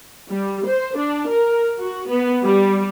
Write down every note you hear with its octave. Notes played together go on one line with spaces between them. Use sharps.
G3
C5
D4
A#4
F#4
B3
G3